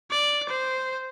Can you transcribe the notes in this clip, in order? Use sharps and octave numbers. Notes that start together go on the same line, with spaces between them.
D5
C5